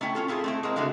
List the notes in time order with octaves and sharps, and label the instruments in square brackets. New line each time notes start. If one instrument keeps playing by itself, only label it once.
[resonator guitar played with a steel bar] A3 C#4 E4 G5
C#4 F4 A4
C4 E4 F4 G#4 A4
A3 C4 E4
G#3 A#3 C4
C#3 G#3 A3 D4 F#4